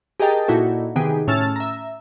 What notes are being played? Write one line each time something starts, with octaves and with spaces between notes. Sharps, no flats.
G4 G#4 A#4 D#5 G5 A5
A#2 D#4 E4 F#4 A4
C3 D#3 B3 G4 G#4
A2 C#4 A5 E6 F6 A6
E5 A#5